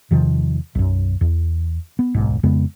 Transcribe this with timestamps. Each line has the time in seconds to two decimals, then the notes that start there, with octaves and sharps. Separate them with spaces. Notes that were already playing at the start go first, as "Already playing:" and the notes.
0.11 E2 C3 D#3 F3
0.75 B1 F#2
1.21 E2
1.99 B3
2.14 D1 B1 G#2
2.43 F2 C#3 G#3 B3